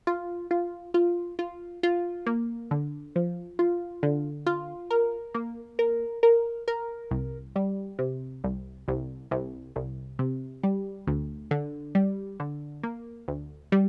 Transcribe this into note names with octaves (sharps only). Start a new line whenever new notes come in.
F4
F4
F4
F4
F4
A#3
D3
F3
F4
D3
F4
A#4
A#3
A#4
A#4
A#4
C2
G3
C3
C2
C2
C2
C2
C3
G3
D2
D3
G3
D3
A#3
D2
G3